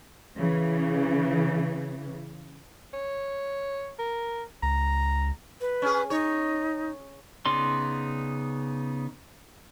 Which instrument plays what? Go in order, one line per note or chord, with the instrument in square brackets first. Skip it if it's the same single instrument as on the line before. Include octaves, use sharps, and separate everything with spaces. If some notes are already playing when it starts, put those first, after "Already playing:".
[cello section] C#3 E3
[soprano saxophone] C#5
A#4
[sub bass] C#2 [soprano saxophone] A#5
[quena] B4
[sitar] C#4 G#4
[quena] D#4 [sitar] C#5
[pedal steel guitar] C#3 B3 D#4 D5 C6